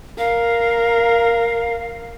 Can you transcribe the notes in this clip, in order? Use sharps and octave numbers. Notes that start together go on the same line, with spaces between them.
A#4 F5